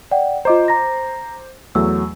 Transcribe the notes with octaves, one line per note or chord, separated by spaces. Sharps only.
D5 F#5 G5
F4 C5 D#5 A#5 D6
A#5 A#6
E2 F#3 A3 E6